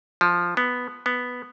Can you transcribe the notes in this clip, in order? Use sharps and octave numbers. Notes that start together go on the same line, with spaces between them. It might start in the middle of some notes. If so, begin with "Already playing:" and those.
F3
B3
B3